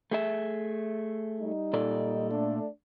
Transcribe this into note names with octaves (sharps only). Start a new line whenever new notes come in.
A3 G#4 E5
G3 D#4
A#2 A4 D5
A3 D4